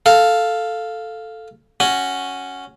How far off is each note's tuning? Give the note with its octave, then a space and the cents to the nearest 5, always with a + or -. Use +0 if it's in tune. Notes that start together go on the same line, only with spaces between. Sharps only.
A4 +0 F5 +0
C#4 +0 F#4 +0